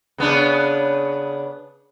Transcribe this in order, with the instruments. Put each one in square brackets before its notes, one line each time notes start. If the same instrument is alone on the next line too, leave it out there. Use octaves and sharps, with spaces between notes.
[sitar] C#3 B3 D4